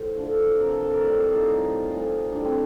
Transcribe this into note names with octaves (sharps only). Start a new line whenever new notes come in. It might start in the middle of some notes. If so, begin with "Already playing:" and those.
Already playing: A2 C5
D3 F3 A3
C3 F3 A3 A#4
A4
A4
A#4
A2 G3 D5
C5
A4
D#4 F4
A2 G3 D#4
A#2 F3 A3
A2 G3 D4
C4